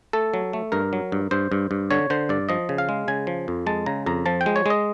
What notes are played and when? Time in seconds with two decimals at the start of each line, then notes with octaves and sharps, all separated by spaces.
0.13 A3 A4
0.34 F#3
0.53 A3
0.72 G2 A#4
0.93 F#3
1.12 G2
1.31 G2 C5
1.52 G2
1.71 G2
1.91 D3 C#5
2.10 D3 C5
2.29 G2 D5
2.49 F3 D#5
2.69 C#3
2.78 F5
2.89 G#3
3.08 C#3 G#5
3.27 F3
3.48 F2
3.67 G#3 A5
3.86 C#3 A#5
4.06 F2 A#5
4.26 F3 A5
4.41 G5
4.46 G#3
4.56 C#5
4.66 G#3 D#5